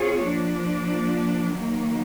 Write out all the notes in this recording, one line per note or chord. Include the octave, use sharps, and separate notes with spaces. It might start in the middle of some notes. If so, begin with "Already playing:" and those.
Already playing: C4 F4 G#4 C#5
F3 A#3 D4
D#3 F#3 A#3